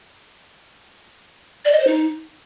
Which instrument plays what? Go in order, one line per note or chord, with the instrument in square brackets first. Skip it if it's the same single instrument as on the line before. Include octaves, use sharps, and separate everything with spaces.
[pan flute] D5
D#5
C5
D#4